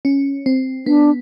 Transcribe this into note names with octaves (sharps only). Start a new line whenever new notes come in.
C#4
C4
B3 D4